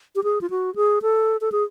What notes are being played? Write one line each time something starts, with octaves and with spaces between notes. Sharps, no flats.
G4
G#4
F4
F#4
G#4
A4
A4
G#4